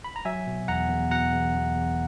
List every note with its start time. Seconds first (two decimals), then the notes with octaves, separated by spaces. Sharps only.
0.04 B5
0.16 A#5
0.25 F#3 E5 G#5
0.47 B2
0.68 E2 F#5 A#5
0.89 E2
1.11 B2 F#5 A#5
1.33 E2
1.54 E2
1.76 E2